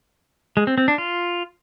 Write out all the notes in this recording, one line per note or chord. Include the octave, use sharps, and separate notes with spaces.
G#3
C4
C4
D4
F4